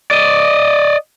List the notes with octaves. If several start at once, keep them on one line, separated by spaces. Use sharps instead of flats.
D5 D#5